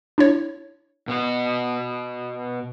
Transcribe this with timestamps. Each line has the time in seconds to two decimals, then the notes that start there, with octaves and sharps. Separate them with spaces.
0.18 D4 E4 C#5
1.08 B2 B3 F#4